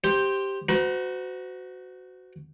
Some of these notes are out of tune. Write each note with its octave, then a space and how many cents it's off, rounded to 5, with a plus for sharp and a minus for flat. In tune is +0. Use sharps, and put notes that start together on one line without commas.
G4 +0 C5 +5
F#4 +0 C5 -40 A#5 +30